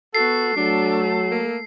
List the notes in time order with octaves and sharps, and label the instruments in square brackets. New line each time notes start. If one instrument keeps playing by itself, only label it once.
[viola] B3 F#4 [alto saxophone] A4 [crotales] C7
[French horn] F#3 [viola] A3 A4 [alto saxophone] D4
[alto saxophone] A#3